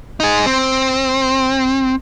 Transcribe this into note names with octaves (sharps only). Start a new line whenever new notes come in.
D#4 G#4
C4